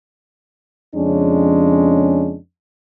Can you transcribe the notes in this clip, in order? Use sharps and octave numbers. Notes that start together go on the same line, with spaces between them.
F2 C#3 G#3 C#4 D4